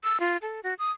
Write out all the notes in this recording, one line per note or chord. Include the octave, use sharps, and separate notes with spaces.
E6
F4
A4
F#4
D#6